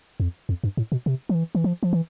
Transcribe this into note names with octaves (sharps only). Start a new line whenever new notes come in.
F2
F2
G2
A2
B2
C3
F3
E3
E3
F3
F3
E3